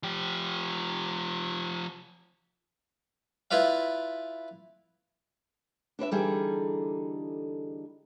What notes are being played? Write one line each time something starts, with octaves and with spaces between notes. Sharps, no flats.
F3 G4
E4 F4 B4 D5 F5
D4 B4 C5 E5
D3 E3 G3 D#4 G#4 A4